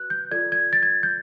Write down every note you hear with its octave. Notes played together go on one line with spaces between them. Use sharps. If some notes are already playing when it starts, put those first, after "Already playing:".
Already playing: F#4 B4 F#6
G6
F4 A4 D5 G#6
G#6
A6
G#6
G6